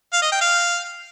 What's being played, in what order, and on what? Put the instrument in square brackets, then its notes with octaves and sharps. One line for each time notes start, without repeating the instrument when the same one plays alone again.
[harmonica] F5
D#5
G5
F5